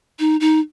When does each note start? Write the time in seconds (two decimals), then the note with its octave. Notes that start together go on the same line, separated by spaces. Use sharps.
0.19 D#4
0.41 D#4